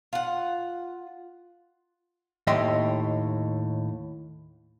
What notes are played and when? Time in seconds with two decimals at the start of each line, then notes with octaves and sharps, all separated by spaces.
0.13 F4 F#5
2.47 D#2 A2 D#5 E5 G5 C6